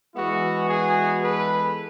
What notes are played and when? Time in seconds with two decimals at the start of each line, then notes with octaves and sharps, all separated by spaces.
0.15 E3 G#3 B3 E4 F#4
0.68 F#4 G#4
1.21 A4 B4